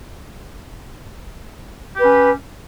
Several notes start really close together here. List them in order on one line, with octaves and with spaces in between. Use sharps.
G4 B4 C#4